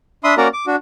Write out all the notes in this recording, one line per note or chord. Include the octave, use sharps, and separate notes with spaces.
D4 E5 B5 C6 D#6
A#3 C#4 F#4 A#4 D5 A#5
D6
D4 F#4